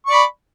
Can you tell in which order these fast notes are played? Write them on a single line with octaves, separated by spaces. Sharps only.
C#6 D5 B5